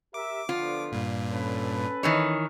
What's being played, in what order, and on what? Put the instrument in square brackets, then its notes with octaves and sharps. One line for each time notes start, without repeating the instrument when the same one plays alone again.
[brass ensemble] G4 A#4 E5 [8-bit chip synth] D6
[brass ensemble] D3 F3 B3 [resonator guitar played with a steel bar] F4
[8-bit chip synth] G2 A#2
[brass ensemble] C#4 A4 B4
[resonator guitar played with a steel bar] D#3 E3 C#5